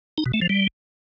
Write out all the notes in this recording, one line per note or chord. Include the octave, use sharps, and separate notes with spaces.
D#4
B2
A3
F3
G3